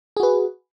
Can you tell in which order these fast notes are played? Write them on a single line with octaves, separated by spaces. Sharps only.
G#4 F#4 B4